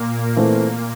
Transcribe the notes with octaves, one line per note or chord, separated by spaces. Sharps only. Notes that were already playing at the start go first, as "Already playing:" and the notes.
Already playing: A#2 A#3
A#2 E3 A3 A#3 C4